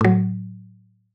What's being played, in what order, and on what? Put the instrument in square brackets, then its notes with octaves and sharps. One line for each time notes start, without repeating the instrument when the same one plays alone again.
[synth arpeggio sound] A2 F#3